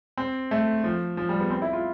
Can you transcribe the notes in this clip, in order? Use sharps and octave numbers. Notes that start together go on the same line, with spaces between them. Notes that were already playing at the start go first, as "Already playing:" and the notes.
C4
A3
F3
F3
G3
B3
C4
E4
F4